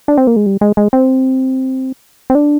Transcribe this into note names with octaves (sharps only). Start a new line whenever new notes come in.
D4
C4
A#3
G#3
G3
G#3
G#3
C4
C4
D4